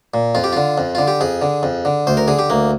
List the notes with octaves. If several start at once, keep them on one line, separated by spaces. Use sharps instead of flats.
A#2
F2 F4
G4
D3 F4
F2
D3 F4
G4
F2 G#4
D3
F2
D3
D2 C5
A#4
D3 G#4
G4
D2 A#3